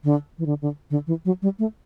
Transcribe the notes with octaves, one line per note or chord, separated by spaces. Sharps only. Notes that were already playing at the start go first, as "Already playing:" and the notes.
D3
E3
D3
D3
D3
E3
F#3
G3
A3